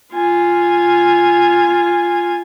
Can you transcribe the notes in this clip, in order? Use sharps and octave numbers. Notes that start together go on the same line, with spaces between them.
F4 G#5